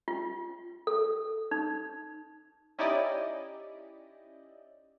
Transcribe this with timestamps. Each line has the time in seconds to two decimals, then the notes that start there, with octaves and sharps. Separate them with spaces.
0.08 F4
0.87 A4
1.51 D#4
2.78 C#4 D#4 E4 G4 D5 D#5